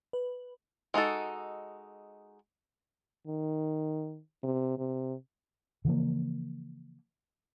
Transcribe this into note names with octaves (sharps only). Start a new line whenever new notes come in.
B4
G#3 D#4 F#4 A4
D#3
C3
C3
C#3 E3 F3 A#3